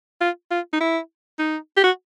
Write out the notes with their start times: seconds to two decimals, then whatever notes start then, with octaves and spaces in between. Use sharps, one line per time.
0.21 F4
0.51 F4
0.73 D#4
0.81 E4
1.39 D#4
1.77 G4
1.84 F#4